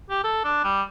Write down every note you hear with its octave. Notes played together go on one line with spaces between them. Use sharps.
G4
A4
D4
G3